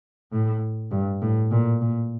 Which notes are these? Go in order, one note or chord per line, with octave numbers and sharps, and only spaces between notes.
A2
G2
A2
A#2
A#2